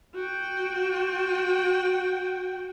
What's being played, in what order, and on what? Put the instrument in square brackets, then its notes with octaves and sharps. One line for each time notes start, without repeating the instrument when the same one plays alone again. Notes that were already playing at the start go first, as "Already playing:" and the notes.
[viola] F#4 G5